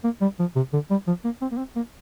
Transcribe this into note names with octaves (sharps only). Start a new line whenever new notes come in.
A#3
G3
F3
C3
D3
G3
F3
A#3
C4
A#3
C4
A#3